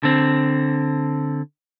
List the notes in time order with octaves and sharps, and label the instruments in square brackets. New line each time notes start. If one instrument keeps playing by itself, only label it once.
[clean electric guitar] D3 C4